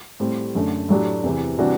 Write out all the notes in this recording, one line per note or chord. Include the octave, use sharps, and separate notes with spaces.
A2 G3 C4 G4
F#2 D3 A3
A2 F#3 A3 D4 G4
E2 C3 E3
C3 E3 G3 D4 F#4